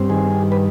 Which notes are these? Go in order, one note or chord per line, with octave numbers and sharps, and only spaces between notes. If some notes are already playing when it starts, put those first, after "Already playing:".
Already playing: G2 C4
D#3 G#4
B4